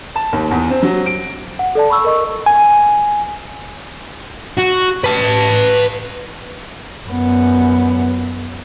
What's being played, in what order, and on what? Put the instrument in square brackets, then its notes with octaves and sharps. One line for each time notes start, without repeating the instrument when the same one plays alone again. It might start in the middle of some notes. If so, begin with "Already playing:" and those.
[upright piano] A5
D#2
E2
C4
F#3
D7
[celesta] F#5
A4 D5 A5
B5 C#6 E6
A#4 D#5 C#6
[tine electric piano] G#5
[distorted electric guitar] F#4
B4 A5
[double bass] F#2 B3